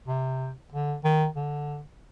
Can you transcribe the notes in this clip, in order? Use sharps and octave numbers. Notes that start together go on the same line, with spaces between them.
C3
D3
D#3
D3